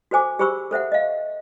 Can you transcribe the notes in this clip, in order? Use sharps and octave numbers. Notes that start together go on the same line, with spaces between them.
F#4 A4 C5 G#5 D6
G4 G#4 C5 B5 C#6 E6
A4 C5 E5 F#5
D#5 F5